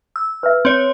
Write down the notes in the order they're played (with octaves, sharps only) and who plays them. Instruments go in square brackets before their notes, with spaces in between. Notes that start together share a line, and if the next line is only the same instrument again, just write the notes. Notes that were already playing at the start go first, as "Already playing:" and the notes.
[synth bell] E6
[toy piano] B4 E5
[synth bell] C4 C#5